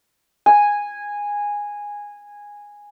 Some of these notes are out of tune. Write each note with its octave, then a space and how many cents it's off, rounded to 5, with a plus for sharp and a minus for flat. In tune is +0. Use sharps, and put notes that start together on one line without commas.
G#5 -10